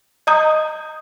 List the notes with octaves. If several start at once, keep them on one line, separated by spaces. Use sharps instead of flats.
D#5 A#5 D#6 G6